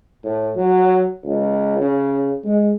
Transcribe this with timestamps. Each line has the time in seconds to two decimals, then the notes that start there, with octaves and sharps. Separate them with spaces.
0.24 A2
0.56 F#3
1.24 C#2
1.79 C#3
2.44 G#3